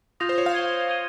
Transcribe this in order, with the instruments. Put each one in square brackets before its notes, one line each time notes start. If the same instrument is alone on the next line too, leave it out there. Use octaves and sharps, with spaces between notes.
[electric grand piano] F4 [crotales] D#6 G6 A#6 F7
[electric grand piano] C5
C#5
F5
[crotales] G#6 D#7 G7
D#6 G#6 D#7 G7